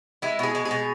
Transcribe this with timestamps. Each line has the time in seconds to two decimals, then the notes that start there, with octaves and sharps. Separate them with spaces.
0.22 G#3 E4
0.39 B2 G#4
0.55 G#3
0.65 G#4
0.71 B2